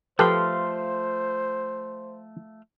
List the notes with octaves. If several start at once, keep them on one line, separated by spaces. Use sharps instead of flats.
F3 A3 G4 A4 B4 C5 F5 C6